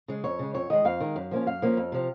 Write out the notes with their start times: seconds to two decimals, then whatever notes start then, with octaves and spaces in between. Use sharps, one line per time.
0.08 C#3 G#3
0.24 F2 C#5
0.39 C#3 G#3
0.54 F2 C#5
0.70 D#3 G#3 D#5
0.85 F2 F5
1.01 D#3 G#3
1.16 F#2
1.31 F3 A#3 C#4
1.46 F#2 F5
1.62 F3 A#3 C#4
1.77 F2
1.92 C3 F3